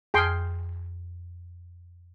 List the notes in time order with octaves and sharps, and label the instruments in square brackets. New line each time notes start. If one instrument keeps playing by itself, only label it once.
[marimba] F2 F6 [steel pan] G#4 G5 C6